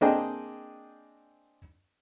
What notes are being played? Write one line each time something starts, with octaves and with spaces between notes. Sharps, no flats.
A#3 C4 D4 G#4 D#5 G5